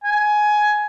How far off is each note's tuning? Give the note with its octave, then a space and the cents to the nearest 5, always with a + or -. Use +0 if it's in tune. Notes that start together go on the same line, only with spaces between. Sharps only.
G#5 +15